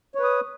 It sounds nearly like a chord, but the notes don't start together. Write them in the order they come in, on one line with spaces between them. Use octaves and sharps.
C#5 B4 D#6